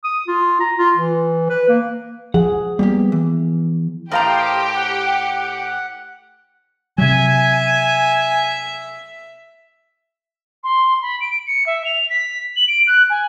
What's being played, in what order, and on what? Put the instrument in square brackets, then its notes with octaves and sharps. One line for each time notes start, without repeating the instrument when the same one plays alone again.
[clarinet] D#6
F4
A#5
F4
E3
B4
A#3
[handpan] F3 G#4 [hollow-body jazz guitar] F#5
[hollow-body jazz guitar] G3 A#3 G4 [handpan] B3
[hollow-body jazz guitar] E3
[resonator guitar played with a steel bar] A2 F5 A#5 [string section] G4 [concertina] A#4 C5 D#5
[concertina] F#5
[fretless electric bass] C3 F#3 [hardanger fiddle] E5 [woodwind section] G#5
[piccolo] C6
B5
D7
C#7
E5
F7
B6
F#7
D7
F#6
G#5